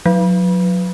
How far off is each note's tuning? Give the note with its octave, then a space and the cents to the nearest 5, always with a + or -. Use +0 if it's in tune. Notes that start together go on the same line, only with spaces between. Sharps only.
F#3 -35